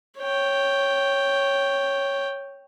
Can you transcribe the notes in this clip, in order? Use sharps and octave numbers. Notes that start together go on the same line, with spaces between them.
C#5 G5